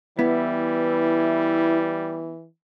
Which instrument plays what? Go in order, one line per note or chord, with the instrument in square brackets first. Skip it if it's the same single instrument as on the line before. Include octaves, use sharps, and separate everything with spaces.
[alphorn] E3 [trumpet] G3 [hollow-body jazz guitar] B3 [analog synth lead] E4